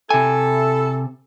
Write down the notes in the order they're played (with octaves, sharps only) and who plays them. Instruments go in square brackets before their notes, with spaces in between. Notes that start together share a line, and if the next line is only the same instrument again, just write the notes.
[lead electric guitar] C3 G#5 [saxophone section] E4 A4